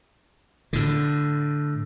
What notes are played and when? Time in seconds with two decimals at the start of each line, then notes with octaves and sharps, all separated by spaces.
0.73 A2 D3